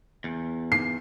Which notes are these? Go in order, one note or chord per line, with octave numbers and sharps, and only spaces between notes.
E2
C7